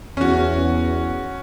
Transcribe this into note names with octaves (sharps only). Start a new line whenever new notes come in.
E2 C#4 F#4